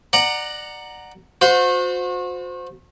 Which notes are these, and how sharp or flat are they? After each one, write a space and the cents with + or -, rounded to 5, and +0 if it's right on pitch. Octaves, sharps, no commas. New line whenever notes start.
D5 +25 F#5 +0 A#5 +0
F#4 -40 C5 -15